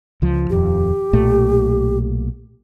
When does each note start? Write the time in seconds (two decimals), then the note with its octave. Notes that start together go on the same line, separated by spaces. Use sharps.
0.22 C#2 F3
0.50 D#1 F2 G4
1.13 B1 A#2 A3